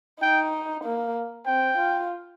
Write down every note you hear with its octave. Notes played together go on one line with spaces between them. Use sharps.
D#4 G5
A#3
C4 G5
F4